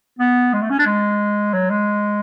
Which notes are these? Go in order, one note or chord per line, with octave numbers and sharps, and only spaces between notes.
B3
G#3
A3
C#4
D4
G#3
F#3
G#3